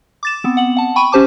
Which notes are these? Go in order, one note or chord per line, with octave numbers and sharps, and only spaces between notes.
D6 A6 E7
B3 C4
F#5 F#7
F#5 A5
G5 B5 C#6 D#7
C#4 G4 C5 A5 D6